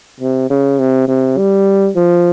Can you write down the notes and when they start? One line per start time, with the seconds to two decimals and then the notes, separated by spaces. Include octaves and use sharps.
0.20 C3
0.50 C#3
0.79 C3
1.08 C3
1.38 G3
1.96 F3